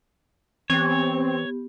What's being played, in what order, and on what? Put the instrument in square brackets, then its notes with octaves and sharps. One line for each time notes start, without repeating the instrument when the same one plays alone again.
[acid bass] E3 [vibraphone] B3 G4 [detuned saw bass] C4 [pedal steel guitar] C#5